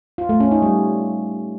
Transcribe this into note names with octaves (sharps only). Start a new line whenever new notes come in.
F4
A3
C#4
D#4
G3